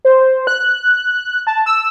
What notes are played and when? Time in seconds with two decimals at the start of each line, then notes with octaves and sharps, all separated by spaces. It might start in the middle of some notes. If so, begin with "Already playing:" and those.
0.05 C5
0.47 F#6
1.47 A5
1.66 E6